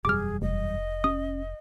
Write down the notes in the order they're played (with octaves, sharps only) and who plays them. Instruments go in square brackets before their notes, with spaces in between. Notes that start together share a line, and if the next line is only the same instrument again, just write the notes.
[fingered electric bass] E1 F#2 G3 [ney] G#4 [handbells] D6 F6
[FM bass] F1 [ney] D#5
[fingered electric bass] C#4 [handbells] D#6